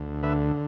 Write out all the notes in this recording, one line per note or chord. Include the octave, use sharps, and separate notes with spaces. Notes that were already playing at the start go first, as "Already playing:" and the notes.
Already playing: D2
D3 B4 E5